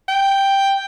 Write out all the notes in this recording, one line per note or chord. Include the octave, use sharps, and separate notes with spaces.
G5